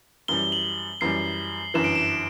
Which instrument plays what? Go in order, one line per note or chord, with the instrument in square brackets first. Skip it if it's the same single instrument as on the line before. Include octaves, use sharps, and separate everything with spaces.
[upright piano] F#2 E3 G3 [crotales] G7
[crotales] F#7
[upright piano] F#2 E3 G3 [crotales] C7
[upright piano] G1 F#2 E3 [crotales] E7
[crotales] D7
E7